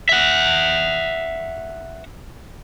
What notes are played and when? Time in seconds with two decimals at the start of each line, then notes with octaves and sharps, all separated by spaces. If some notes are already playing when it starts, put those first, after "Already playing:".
0.09 E5 F#5